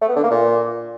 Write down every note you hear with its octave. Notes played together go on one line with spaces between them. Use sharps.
A3
B3
D3
A#3
A#2